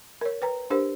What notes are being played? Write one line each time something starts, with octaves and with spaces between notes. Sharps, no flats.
A#4 C#5
B4 G5 A#5
D4 G4 A#4 C5